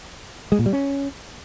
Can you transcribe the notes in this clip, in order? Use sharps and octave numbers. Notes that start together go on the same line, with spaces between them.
G#3
A#2
G3
C#4